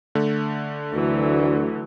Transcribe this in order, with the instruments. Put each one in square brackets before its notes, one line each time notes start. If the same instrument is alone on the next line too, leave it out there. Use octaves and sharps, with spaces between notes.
[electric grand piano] D3 A3
[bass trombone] D2 [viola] E3 F#3